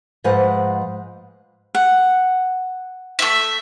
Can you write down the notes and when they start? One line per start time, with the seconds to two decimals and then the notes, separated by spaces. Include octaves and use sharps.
0.24 G#2 F3 G#3 B4 F#5
1.75 F#5
3.19 A3 E5